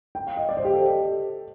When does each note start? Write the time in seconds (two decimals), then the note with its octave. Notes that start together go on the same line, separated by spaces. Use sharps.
0.15 G5
0.27 F5
0.37 D#5
0.49 D5
0.57 C5
0.65 G4
0.72 A4